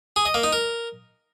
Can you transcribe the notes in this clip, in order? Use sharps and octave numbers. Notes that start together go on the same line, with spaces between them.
G#4
D#5
A#3
D#4
A#4